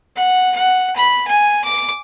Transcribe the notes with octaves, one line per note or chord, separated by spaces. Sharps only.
F#5
F#5
B5
G#5
D6